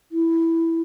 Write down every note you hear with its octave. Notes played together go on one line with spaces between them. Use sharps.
E4